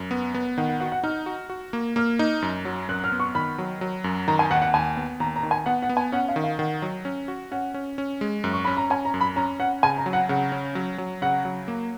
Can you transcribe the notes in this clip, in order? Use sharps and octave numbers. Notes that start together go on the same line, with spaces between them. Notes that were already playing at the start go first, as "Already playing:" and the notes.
Already playing: F#2
B3
B3
D#3 F#5
F#5
F#4 F#5
F#5
D#4 F6
F#4
F#4
A#3
A#3 F6
D#4
F#2
F#3
F#2 F#6
F6
B3
C#6
D#3 B5
F#3
F#3
F#2
D#3 A#5
G#5
D#2 F#5
F#5
D#2 G#5
B3
D#2 A#5
A#5
D#3
G#5
B3 F#5
F#5
B3
G#5
C#4 F#5
F5
D#3
F5
D#3 F#5
F#3
C#4
F#4
C#4 F#5
C#4
C#4
G#3
F#2
C#6
C#4 B5
A#5
C#4 G#5
A#5
F#2
B5
C#4 A#5
C#4 F#5
C#3 G#5
A#5
F#3
F#5
C#3 F#5
C#4
F#3
F#3
C#3 F#5
F#3
A#3